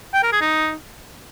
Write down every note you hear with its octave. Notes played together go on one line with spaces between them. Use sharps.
G5
A#4
G#4
D#4